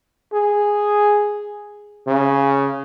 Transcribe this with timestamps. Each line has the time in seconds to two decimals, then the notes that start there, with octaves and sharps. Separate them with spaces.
0.33 G#4
2.07 C#3